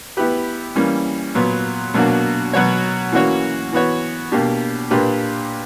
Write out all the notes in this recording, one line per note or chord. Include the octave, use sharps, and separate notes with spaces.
B3 E4 G4 B4
E3 G3 A#3 C#4
A#2 F#3 B3
B2 F#3 A#3 D4 F#4
B2 F#3 B3 F#4 C#5
E3 A#3 C#4 F#4 C#5
E3 B3 F#4 C#5
B2 A#3 D4 G4
A#2 A#3 D4 G4 B4